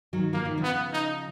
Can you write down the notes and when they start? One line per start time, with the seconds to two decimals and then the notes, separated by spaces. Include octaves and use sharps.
0.13 D#3 F#3
0.33 F3 A#3
0.45 D#3
0.58 C#3 F3
0.63 B3
0.93 D#4